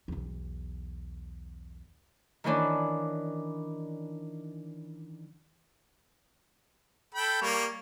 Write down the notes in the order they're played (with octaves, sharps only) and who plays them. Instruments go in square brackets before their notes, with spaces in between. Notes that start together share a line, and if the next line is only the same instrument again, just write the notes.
[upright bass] B1 E2
[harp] D#3 E3 C#4 D4
[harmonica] A4 G5 B5
G3 A#3 C#5